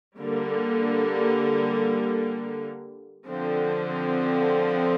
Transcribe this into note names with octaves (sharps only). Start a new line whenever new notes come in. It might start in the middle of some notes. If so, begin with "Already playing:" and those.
D3 G3 A#3
D3 F3 C4